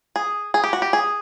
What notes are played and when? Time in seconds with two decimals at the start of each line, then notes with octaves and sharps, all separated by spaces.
0.16 G#4
0.54 G#4
0.64 G4
0.73 F#4
0.82 G4
0.93 G#4